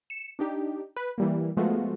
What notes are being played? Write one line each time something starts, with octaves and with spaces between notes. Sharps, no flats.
C#7 E7
D4 D#4 G4
B4
E3 G3 A#3
F3 G#3 A3 B3 F4 F#4